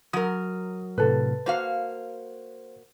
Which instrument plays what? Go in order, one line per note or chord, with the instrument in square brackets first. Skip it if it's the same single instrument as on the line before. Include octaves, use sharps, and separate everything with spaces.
[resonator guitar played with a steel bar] F#3 A#4 [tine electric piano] D#6
[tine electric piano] A2 C3 [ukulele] A4 B4
[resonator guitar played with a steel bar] A#3 F#4 F5 [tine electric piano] C5